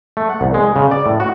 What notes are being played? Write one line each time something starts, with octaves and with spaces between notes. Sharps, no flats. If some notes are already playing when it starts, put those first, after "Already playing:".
A3
F#5
C2
G#3
C#3
D5
A2
F#4